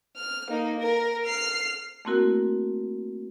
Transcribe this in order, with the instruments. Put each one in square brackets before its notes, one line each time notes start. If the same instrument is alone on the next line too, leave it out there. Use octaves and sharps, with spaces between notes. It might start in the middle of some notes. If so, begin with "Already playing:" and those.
[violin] F6
A#3 D#4
A#4
F6 C7
[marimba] A3 A#3 C4 E4 F#4 A#4